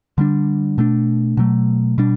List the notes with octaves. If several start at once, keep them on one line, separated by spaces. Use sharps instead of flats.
D3 G3 D4
B2 A3 D4
B2 F#3 A3
B2 G3 D4